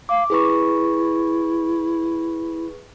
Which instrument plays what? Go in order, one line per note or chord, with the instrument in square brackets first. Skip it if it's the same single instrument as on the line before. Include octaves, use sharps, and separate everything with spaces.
[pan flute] F5 [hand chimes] D6
[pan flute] E4 [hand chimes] G#4 B4 C#6